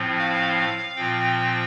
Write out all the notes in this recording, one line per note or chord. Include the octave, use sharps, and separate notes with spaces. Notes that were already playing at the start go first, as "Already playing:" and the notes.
Already playing: A2 F3 C4
F5
A#2 F3 C4 G5